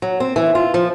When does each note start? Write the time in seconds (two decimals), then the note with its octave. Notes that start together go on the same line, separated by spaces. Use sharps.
0.02 F#3
0.20 C4
0.36 E3
0.55 F4
0.74 F3